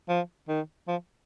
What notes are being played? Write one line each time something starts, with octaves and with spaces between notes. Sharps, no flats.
F3
D#3
F3